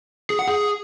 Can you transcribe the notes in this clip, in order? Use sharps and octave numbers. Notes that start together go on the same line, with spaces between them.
G#4
F#5
G#4